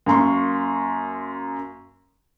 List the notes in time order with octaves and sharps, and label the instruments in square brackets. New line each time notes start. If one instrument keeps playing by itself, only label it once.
[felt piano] F#2 A#3 C6 C#6